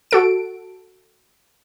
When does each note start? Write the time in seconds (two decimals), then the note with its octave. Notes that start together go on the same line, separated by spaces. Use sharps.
0.11 F#4 A4 D7